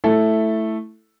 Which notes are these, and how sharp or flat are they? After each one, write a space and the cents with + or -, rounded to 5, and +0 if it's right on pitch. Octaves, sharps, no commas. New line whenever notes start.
A3 +0 E4 +0 A4 +0